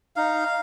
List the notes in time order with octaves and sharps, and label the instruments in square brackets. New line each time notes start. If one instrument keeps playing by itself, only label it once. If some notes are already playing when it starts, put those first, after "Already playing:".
[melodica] D#4 F5